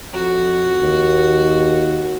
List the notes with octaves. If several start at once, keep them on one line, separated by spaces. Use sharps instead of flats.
F2 F#4
D#2